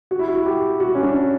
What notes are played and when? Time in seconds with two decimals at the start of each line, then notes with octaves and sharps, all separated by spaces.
0.11 F#4
0.19 E4
0.28 F#4
0.46 G4
0.80 F#4
0.95 C#4
1.03 D4